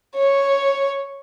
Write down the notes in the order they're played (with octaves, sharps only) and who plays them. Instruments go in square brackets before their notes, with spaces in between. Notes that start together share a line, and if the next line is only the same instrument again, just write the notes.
[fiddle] C#5